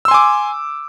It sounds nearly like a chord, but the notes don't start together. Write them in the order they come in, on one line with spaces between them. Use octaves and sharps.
E6 C6 G#5 D6